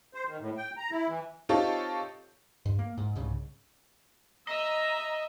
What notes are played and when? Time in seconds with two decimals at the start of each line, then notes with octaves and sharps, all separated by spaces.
0.14 C5
0.26 D#3
0.40 A2
0.57 G5
0.77 A#5
0.91 E4
1.09 E3
1.49 C4 D#4 F4 G4 A4 C#5
2.66 G2
2.79 A#3
2.98 G#2
3.16 C2 G#2 C#3
4.47 D#5 E5 A#5